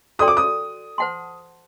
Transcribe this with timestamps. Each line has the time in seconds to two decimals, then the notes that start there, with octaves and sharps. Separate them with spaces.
0.19 F#4 A4 D5 G5 C6 D#6
0.28 D6
0.37 D#6
0.98 C5 F#5 A5 C6